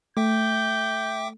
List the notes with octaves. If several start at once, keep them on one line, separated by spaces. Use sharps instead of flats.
A3 E5 G5 D6 G6